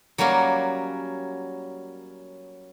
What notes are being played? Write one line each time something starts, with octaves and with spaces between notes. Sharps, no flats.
F#3 G3 A#3 C#4 F#4